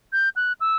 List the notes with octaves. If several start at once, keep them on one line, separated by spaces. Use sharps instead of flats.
G6
F#6
E6